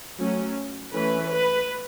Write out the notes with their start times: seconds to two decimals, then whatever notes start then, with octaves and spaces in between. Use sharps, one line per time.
0.18 F#3 A3 C#4
0.92 E3 A3 C#4 B4
1.30 B4